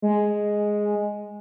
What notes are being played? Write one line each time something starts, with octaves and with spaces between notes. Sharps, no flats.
G#3